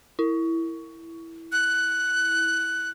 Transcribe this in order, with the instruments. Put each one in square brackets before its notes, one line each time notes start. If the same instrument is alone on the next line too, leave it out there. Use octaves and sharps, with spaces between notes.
[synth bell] E4
[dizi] F#6